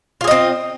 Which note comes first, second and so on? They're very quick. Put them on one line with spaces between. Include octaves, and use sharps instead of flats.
F4 G#4 D#5 C4